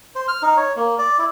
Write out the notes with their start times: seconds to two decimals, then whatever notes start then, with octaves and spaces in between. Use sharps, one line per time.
0.16 C5
0.28 F6
0.42 D#4
0.57 C#5
0.77 A#3
0.99 D5
1.19 E4